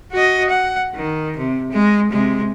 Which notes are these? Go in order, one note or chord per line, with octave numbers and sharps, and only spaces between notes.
F#4 D#5
F#5
D#3
C3
G#3
C3 G#3